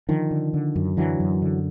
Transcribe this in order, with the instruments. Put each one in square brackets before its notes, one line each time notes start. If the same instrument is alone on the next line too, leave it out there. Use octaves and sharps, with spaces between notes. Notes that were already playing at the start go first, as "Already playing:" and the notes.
[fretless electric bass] D3 D#3 F3
D3
D3
F#2
D3 E3 F#3
F#2
D3